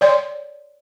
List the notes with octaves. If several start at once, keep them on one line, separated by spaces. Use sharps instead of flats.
C#5 D5 C6